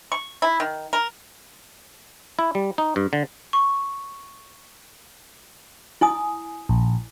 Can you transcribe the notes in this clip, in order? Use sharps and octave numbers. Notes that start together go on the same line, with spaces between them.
C#6
E4
D#3
A#4
E4
G3
D#4
G2
D3
C#6
E4 G#5 D#6
A#1